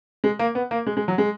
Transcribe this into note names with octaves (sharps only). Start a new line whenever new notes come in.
G#3
A#3
B3
A#3
G#3
G#3
F#3
G#3